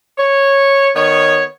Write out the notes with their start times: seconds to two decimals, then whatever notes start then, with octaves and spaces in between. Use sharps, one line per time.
0.18 C#5
0.96 D#3 B3 C#5